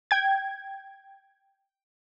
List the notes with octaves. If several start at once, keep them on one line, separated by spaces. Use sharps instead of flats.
G5 G#6